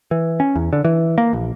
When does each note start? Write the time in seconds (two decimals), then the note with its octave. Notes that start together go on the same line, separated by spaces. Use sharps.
0.11 E3
0.40 C#4
0.56 E2
0.73 D3
0.84 E3
1.18 A#3
1.33 A#1